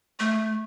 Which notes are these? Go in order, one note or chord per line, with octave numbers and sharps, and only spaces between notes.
A3